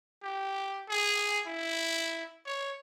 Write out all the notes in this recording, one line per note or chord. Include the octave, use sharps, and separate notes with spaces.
G4
G#4
E4
C#5